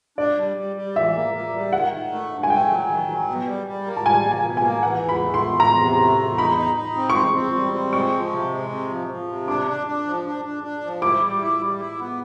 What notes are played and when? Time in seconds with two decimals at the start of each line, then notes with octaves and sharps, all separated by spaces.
0.18 D4 D5
0.37 G3
0.57 G3
0.76 G3
0.96 E3 E5
1.15 A#3
1.34 A#3
1.54 G3
1.73 D#3 F#5
1.92 D#3
2.12 A3
2.31 G2
2.43 G#5
2.50 A3 G5
2.70 F#3
2.89 D#3
3.09 F#3
3.28 B2
3.47 G3
3.67 G3
3.86 A#3
3.96 A5
4.06 G3 G#5
4.24 A#3
4.32 G#5
4.44 B2
4.57 G#5
4.64 A#3
4.83 E3 F#5
5.02 E2
5.09 B5
5.22 A3
5.34 C6
5.42 E2
5.60 E2 A#5
5.79 C3
6.00 A3
6.19 E2
6.38 D#4 B5
6.57 D#4
6.76 D#4
6.96 C4
7.10 C#6
7.15 C4 C6
7.35 C4
7.54 G3
7.73 C4
7.93 G#3 C#6
8.12 F3
8.31 C3
8.51 G#3
8.70 C3
8.90 F3
9.09 F3
9.28 C3
9.48 D4 D6
9.67 D4
9.87 D4
10.06 F3
10.26 D4
10.45 D4
10.64 D4
10.84 F3
11.02 E4 D6
11.23 G3
11.42 E4
11.61 G3
11.80 E4
12.00 B3